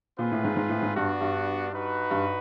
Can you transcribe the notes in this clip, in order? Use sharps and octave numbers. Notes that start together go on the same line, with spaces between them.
A#2 C4 F4 G#4 B4
A2
G#2
G#2
A2
G#2
G2 B3 D4 F#4
G2
D#4 F#4 B4
G2